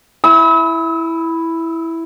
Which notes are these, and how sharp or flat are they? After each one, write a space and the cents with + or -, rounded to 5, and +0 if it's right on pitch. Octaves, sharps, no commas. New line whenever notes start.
E4 +0 E6 -45